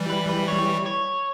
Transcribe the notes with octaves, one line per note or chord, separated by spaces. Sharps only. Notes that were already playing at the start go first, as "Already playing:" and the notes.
Already playing: E3 G3
B4
B4
C#5
C#5